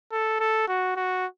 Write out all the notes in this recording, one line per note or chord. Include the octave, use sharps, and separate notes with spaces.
A4
A4
F#4
F#4